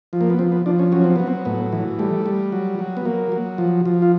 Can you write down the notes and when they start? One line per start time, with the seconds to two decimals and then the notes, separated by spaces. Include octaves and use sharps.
0.13 F3
0.21 A#3
0.30 B3
0.39 F3 C4
0.52 B3
0.66 F3 D4
0.79 C#4
0.92 F#3 C#4
1.04 C4
1.16 F#3 B3
1.27 C4
1.45 A2 B3
1.72 E3
1.99 G3 A3
2.26 G3
2.52 F#3
2.79 F#3
2.97 B3
3.05 F#3 A#3
3.32 F#3
3.58 F3
3.86 F3
4.02 F4